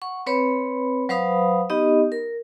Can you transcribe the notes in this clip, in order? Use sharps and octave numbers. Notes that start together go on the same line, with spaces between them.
F#5 C#6
C4 B4 C#5 B5
F#3 B4 C5 F5 B5 D#6
B3 D#4 G4 D#5
A#4